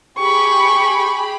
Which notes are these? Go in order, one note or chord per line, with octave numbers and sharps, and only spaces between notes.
G4 G#4 B5 C#6